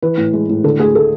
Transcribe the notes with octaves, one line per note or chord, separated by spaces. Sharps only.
E3 B4
A2
G#3
A2
D3 A4
D2 G#4
A3 A4